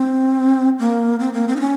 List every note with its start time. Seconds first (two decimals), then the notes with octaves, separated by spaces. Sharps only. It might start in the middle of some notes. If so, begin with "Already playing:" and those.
Already playing: C4
0.79 A#3
1.19 C4
1.33 A#3
1.48 C4
1.56 D#4
1.60 C#4